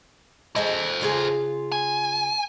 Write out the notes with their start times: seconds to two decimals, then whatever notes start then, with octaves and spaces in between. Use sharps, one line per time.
0.56 G#4 A4 C5 D#5
1.01 C#3 F4 G#4
1.72 G#5